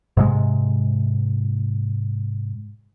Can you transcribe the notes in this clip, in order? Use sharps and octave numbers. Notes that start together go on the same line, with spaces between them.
G#2 C3 G#3